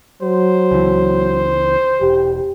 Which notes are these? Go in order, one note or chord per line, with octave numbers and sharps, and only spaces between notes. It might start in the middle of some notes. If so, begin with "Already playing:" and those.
F#3 C5
C#2 E3
E1 G4